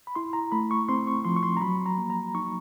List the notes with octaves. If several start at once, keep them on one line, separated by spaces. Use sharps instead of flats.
B5
E4 C6
A#5
A3 B5
C#6
C4 C6
C#6
F3 C6
C#6
C6
A#5
F#3 B5
A#5
A#3
A#5
D#4 C#6